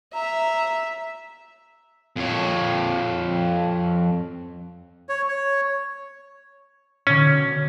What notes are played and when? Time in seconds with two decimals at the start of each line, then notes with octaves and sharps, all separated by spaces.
0.14 E5 A#5
2.16 F2 C#5
5.09 C#5
5.28 C#5
7.07 B2 D3 C#4